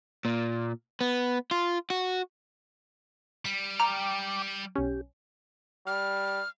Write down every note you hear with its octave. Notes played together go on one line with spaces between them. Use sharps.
A#2
B3
F4
F#4
G3 B6
G5 A#5 D6 F6
B1 C#4 G4
G3 F6